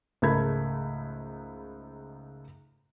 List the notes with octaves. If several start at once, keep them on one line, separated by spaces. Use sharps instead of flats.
C#2 G#2 A3 A#4 B5 G#6